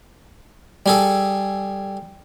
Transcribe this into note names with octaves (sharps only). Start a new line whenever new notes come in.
G3 G#4 A4